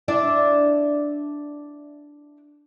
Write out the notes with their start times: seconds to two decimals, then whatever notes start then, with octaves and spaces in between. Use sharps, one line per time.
0.08 D4 E4 D5